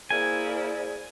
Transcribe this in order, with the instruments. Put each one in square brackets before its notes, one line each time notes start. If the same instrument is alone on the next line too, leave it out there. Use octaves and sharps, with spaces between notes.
[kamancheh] A#3 E4 [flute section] G#4 C5 D5 [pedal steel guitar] G#5